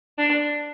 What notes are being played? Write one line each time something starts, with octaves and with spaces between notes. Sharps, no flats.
D4